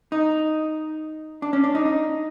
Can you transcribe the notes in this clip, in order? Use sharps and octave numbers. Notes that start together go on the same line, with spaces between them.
D#4
D4
C#4
D4
D#4
D#4